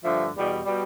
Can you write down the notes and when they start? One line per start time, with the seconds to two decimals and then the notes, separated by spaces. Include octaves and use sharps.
0.03 G2 D3 F3 A3 E5
0.35 E2 B2 G3
0.65 B2 G3